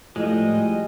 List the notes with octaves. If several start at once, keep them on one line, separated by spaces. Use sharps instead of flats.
A2 F3 G3 G#3 D#5